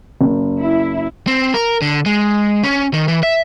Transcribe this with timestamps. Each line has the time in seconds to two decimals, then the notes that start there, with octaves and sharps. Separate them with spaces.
0.21 F#1
0.60 E4
1.27 C4
1.54 A#4
1.82 D3
2.06 G#3
2.63 C#4
2.94 D#3
3.08 E3
3.23 E5